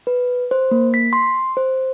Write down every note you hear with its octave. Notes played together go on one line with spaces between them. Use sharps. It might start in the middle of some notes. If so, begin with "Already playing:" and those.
B4
C5
A#3
B6
C6
C5